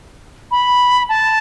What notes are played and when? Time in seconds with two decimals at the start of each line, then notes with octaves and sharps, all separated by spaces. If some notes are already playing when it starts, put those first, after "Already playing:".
0.51 B5
1.09 A5